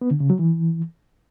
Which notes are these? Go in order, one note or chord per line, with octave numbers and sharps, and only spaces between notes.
B3
D3
C#3
F#3
E3